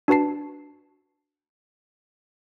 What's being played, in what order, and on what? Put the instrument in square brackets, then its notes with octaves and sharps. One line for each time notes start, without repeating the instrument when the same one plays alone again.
[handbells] D4 F#4 B4 A5 C7